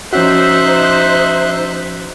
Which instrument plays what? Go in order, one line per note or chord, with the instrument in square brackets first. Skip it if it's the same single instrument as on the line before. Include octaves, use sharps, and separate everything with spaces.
[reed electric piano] F3 C#4 F#4 [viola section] D#4 C5 [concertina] E5 F#6